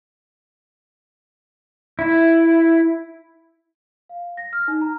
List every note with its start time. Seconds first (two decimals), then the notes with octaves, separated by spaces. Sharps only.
1.99 E4
4.09 F5
4.37 A#6
4.53 F6
4.68 D#4
4.81 A#5